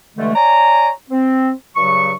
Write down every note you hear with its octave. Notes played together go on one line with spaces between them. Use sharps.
G2 D3 E3 G#3 A3
C#5 D5 G#5 A#5
C4
G2 C#3 F#3 C#6